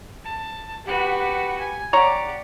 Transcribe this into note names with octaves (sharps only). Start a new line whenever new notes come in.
A5
F#4 G4 B4 F#5
G#5
G4 C#5 D5 F#5 A#5